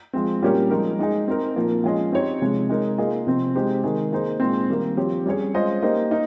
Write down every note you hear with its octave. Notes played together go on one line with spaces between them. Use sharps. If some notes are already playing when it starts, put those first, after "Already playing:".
F3 G#3 C4
A#2 G3 C#4 G4 A#4
F3 G#3 D#4 A#4
G#3 D#4 G#4
C4 D#4 A#4
A#2 F3 A#3
F3 G#3 C#4 G#4 D#5
C4 D#4 G4 C#5
C3 F3 G#3
G#3 D#4 A#4
A#3 F4 G#4 D#5
C3 F3 C4
G#3 C4 D#4 G4 C5
D#3 G#3 D#4 G#4
A#3 D#4 G#4 C5
A#2 G#3 C4
D#3 G3 A#3
F3 C4 G4 C#5
G3 C#4 G#4 C#5
G#3 C#4 F4 C5 D#5
A#3 D#4 G4 C5 D#5
A#3 D#4 A#4